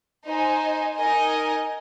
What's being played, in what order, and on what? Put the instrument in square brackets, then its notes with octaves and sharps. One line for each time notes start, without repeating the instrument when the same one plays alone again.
[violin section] D#4 C5 G#5
D#4 A#4 D#5 G#5